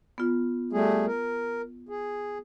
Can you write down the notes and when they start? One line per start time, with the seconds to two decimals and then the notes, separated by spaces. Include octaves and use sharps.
0.18 B3 F4
0.73 G3 A3 G#4
1.07 A#4
1.89 G#4